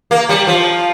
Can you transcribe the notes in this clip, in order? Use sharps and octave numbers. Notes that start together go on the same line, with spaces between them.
A#3
G3
F3